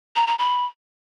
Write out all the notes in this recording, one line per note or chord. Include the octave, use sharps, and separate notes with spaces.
A#5
A#5
B5